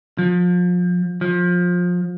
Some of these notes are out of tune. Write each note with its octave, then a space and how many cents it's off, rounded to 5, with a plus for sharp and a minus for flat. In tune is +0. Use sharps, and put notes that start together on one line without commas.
F3 +30
F3 +25